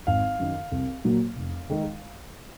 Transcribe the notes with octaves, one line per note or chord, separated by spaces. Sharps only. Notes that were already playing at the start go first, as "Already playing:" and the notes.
G#1 F5
F#2 D#3
C2
A#2 F#3 A#3
F1
D#3 G#3 D#4